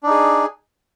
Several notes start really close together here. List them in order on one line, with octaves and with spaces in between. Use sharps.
D4 D#4 G#4